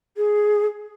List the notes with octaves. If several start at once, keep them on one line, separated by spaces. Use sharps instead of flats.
G#4